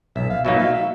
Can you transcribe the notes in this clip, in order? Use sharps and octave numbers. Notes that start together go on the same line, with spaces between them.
B1 E5
F5
B2 F#3 A#3 D#4 E5
F5
E5